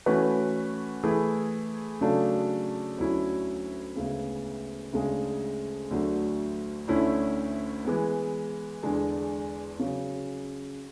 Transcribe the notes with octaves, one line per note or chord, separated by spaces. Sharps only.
E3 A3 C#4 F#4 B4
E3 A3 E4 G#4
C#3 F#3 A3 D4 A4
D2 D3 F#3 C#4 E4
D2 C#3 G#3 B3
D2 C#3 G#3 D4 G#4
D2 D3 F#3 A3
D2 D3 A3 C#4 E4
E3 G#3 B3
E2 D3 G#3 D4
C#3 F#3 C#4